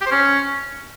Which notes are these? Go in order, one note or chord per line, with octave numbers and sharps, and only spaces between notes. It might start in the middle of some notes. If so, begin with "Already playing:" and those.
G4
C5
C#4